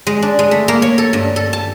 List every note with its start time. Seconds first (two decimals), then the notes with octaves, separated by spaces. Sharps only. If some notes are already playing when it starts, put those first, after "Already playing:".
0.07 G#3
0.22 D4
0.39 G#3
0.51 A3
0.68 A#3
0.82 C#5
0.98 A4
1.13 G2
1.36 A4
1.53 A5